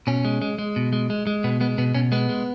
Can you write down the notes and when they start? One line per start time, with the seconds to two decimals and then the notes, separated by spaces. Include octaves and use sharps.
0.07 B2 C#4
0.25 G#3
0.42 G#3
0.58 G#3
0.76 B2
0.93 G#3
1.10 G#3
1.27 G#3
1.44 B2 B3
1.61 G#3 B3
1.78 B2 B3
1.95 B2 C#4
2.12 G#3 B3
2.29 G#3